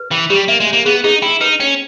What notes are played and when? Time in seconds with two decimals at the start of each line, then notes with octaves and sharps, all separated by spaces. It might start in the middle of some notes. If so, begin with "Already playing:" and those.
Already playing: B4
0.11 E3 G5
0.30 G3 G4
0.48 A#3 E5
0.60 G#3
0.67 C#5
0.73 A#3
0.85 B3 G#4
1.04 D#4 G#4
1.22 E4 G5
1.41 D#4 B4
1.60 C#4 G5